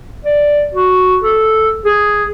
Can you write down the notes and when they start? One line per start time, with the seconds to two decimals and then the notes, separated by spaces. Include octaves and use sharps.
0.25 D5
0.74 F#4
1.22 A4
1.85 G#4